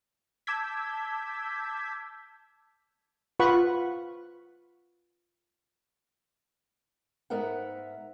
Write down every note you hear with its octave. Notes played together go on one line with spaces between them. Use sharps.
A5 D6 E6 G6 G#6 B6
F4 B4 F#5 B5 C#6
G#2 B3 A#4 E5 F#5